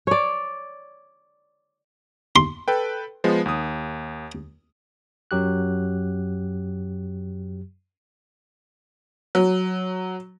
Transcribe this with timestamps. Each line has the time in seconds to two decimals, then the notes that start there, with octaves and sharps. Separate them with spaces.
0.07 C#5 D5
2.36 C6
2.68 A4 B4 G5
3.24 F3 G#3 B3
3.46 D#2 D#6
5.31 F#2 F#3 G4 F#6
9.35 F#3